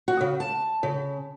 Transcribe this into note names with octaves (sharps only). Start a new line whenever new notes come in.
F#4
C#3
A5
C#3